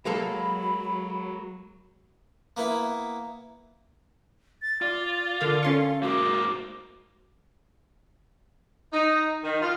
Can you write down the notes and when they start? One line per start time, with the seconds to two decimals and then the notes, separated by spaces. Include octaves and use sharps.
0.05 F#3 G#3 A#3 A4 B5
2.57 A#3 B3 E4
4.62 A6
4.82 F4 D5
5.41 D3 A#4 F5
5.63 C#4 A4 F5 C6 C#6
6.03 G#2 A#3 F#4 D6
8.92 D#4
9.44 D#3
9.61 F4